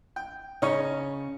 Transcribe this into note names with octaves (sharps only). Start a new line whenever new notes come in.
G5
C#3 C#4 D#4 C#5